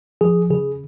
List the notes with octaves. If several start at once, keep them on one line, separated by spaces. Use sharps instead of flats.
F3 G#4
C#3 G#4